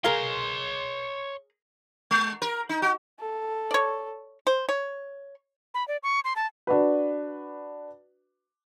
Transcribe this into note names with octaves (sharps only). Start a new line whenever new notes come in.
G#4 A#4 C#5 F5 C6
G#3
A#4
D#4
F#4
A4
C#5 D5
C5
C#5
B5
D5
C#6
C6
A5
D4 F#4 B4